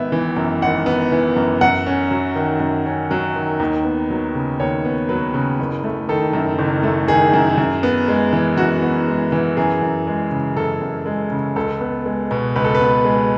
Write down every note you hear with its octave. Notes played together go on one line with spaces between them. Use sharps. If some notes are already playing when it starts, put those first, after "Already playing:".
Already playing: G#1 B3 E5
E3
F#2
G#1 F#5
B3
E3
F#2
F#2 F#5
C#4
F#3
D#3
F#2
C#4
F#3
D#3
D#2
B3
F#3
C#3
D#2 C#5
B3
F#3 B4
C#3
F#1
A3
D#3 A4
F#2
F#1
A3
D#3 G#4
F#2
F#2
B3
G#3
E3
F#2 F#4
B3
G#3
E3
F#2 G#4
F#2
G#3
C#3
F#2 A4
F#2
G#3
C#3
C#2 A4
B3
G#3
B2
C#2 B4
A4
B4
B3
G#3